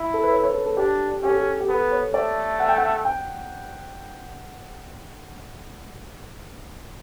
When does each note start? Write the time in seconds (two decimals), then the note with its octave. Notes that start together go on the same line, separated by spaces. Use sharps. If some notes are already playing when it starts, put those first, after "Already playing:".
Already playing: E4
0.14 A4
0.23 B4
0.32 C#5
0.44 C#5
0.54 A4
0.66 A4
0.77 D4 G4
1.23 C#4 G4
1.30 A4
1.37 G4
1.60 G4
1.68 B3 A4
1.91 C#5
2.14 A3 D5
2.60 F#5
2.69 G5
2.78 F#5
3.05 G5